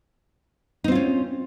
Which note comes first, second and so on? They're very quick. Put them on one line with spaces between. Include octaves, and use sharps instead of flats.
D#4 C4 F4 C#4